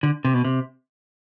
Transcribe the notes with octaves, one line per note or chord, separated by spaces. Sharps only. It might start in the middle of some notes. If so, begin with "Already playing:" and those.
D3
C3
B2
C3